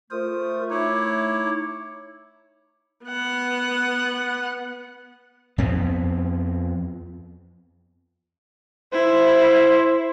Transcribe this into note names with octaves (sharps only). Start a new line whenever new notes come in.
A3 F4 A#4 C5 D#6
D#4 E4 C#5 D6
B3 F#5
F2 B3 C4
E4 C5